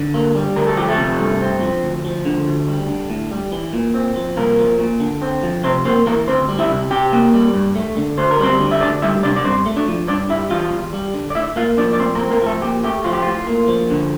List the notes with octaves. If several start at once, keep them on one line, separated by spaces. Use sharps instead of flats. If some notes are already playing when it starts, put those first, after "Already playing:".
Already playing: D3
A#3
G3
D2 A#4
A4
F3 G4
A3 A4
C3
G2
C4
F3
D2
F3
D3
D2
G3
D3
A2
G3
E3
A#2
C4
F3
C2 A#3 A#4
F3
A#2
D3
C4
F3
C3 C4 C5
A#3 C4 C5
E3 A#3 A#4
D2 C4 C5
G3
E4 E5
C3
C3 G4 G5
A#3
G3
G2
A3
D3
D2 C5
A#4
G3 C4 C5
D3
E5
D2 D4 D5
G3 E4 E5
C3 D4 D5
D5
G2 C4 C5
A3
D4 D5
F3
G2 D4 D5
G3 E4 E5
E3 F4 F5
E2
G3
D3
D5
A2 E4 E5
A#3 F4 F5
F3 D4 D5
D5
A2 C4 C5
A#3 A#4
C4
A#3 A#4
F3 A3 A4
A#2 G4
A3 G4
F3 F4
G4
A2 F4
A#3
F3
D3